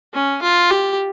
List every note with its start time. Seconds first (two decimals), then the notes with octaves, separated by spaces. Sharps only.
0.14 C#4
0.43 F4
0.71 G4